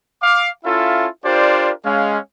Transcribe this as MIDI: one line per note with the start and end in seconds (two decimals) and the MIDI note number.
0.22 0.48 77
0.22 0.48 86
0.65 1.07 61
0.65 1.07 64
0.65 1.07 65
0.65 1.07 69
0.65 1.07 76
0.65 1.07 77
1.25 1.71 62
1.25 1.71 65
1.25 1.71 67
1.25 1.71 70
1.25 1.71 72
1.25 1.71 74
1.85 2.17 56
1.85 2.17 61
1.85 2.17 77